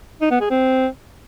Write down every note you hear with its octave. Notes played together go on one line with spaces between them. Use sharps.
D#4
B3
G#4
C4